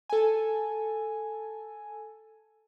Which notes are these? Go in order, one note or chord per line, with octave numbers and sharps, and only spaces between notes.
A4 G#5